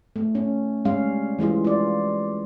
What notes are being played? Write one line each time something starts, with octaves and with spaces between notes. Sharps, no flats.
A3
C#4
G3 G#3 C#4 F5
E3 G3 G#3 F4
F4 D5